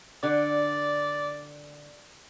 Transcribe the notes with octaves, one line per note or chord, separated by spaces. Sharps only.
D3 D5